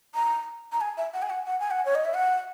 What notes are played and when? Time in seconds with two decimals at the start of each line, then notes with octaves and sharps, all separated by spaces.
0.15 A#5
0.72 A#5
0.81 G#5
0.97 E5
1.14 F#5
1.22 G#5
1.30 F#5
1.47 F#5
1.60 G#5
1.71 F#5
1.85 C#5
1.95 D#5
2.05 E5
2.14 F#5